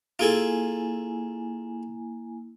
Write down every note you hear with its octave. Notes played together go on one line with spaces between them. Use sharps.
A#3 E4 F4 G#4 A4 G#5